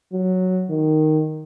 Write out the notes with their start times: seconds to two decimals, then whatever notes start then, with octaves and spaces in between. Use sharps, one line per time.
0.13 F#3
0.70 D#3